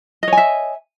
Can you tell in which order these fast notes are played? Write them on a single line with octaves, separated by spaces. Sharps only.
D#5 C#5 G#5 E5